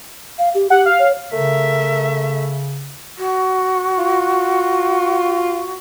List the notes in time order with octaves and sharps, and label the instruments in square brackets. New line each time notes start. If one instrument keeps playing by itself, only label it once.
[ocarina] F5
G4
[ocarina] G4 [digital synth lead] F#5
[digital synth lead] F5
[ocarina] C#5
[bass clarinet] C#3 [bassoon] A3 [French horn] A#4 [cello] E5
[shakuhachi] F#4
[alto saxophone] F4